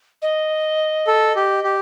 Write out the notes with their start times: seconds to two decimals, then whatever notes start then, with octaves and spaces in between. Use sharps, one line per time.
0.22 D#5
1.07 A4
1.36 G4
1.64 G4